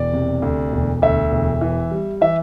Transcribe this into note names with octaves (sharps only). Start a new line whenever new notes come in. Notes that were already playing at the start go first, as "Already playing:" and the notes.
Already playing: E1 D5
C3
D2
E1
D2 E5
E1
E3
G3
E3 E5